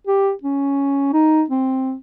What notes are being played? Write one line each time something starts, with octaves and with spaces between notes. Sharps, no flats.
G4
C#4
D#4
C4